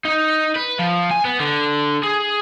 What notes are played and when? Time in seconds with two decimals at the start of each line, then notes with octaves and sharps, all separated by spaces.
0.05 D#4
0.56 B4
0.79 F3
1.11 G#5
1.25 B3
1.40 D3
2.03 G#4